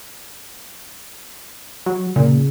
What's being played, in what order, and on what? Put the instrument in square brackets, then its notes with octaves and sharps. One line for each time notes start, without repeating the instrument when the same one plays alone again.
[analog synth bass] F#3
[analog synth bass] A#2 [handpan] C#3